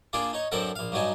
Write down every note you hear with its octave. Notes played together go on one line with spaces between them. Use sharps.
A#3 D4 F4 G#4 D5
D#4 C#5
F#2 D3 C4 A4 A#4 F#5
A#1 F5
G2 F#3 D4 D#4 G#5